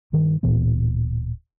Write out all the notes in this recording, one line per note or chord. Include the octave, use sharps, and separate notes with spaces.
G2 D#3
D1 A#2 E3 B3